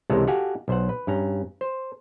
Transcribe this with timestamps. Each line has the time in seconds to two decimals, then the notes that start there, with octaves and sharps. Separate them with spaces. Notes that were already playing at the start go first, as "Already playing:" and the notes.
0.10 C#2 C3 E3 G#3 A4 A#4
0.27 F#4 G4 A4 F5 F#5 G#5
0.68 B1 C5 F#5
0.89 B4
1.07 G2 C#4 A#5
1.61 C5